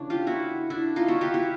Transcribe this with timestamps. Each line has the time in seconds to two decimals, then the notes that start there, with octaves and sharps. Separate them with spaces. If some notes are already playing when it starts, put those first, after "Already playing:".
Already playing: C#3 E3 A3 D4
0.10 F4 G4
0.27 E4 F#4
0.70 D4 E4
0.96 D#4 F4
1.08 E4 F#4
1.21 F4 G4
1.34 E4 F#4